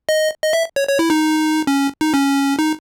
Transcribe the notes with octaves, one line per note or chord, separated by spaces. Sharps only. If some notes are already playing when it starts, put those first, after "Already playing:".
D#5
D#5
E5
C#5
C#5
E4
D#4
C#4
D#4
C#4
D#4